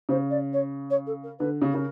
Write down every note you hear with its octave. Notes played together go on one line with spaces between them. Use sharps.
C#3 C5
D5
C#5
C#5
A4
A#4
D3 B4
C#3
C#3 A#4